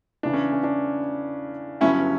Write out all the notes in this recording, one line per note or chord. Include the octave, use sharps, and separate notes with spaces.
E2 C#3 E3 D4
C#4
C#4
D4
G1 G2 F#3 C#4 E4